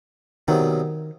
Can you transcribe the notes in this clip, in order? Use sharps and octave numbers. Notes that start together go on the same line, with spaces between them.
C2 B2 D#3 F#3